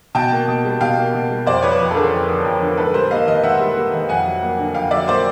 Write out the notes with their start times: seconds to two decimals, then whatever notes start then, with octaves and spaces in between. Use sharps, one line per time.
0.15 B2 G5 A5
0.32 A#3
0.48 B2
0.65 G3
0.81 B2 F5 G5
0.98 A#3
1.14 B2
1.31 G3
1.46 F2 C5 D5
1.62 F3 B4 C#5
1.80 F2
1.91 A4
1.96 D3 G#4 A#4
2.13 F2
2.28 F3
2.45 F2
2.62 D3
2.77 G#2 A4 B4
2.94 G3 A#4 C5
3.11 A#3 D#5 F5
3.27 D#3 D#5 F5
3.43 G#2 E5 F#5
3.60 G3
3.77 A#3
3.94 D#3
4.09 F2 F#5 G#5
4.26 F#3
4.42 A#3
4.59 D3
4.75 F2 F5 G5
4.91 F#3 D5 E5
5.08 A#3 C5 D5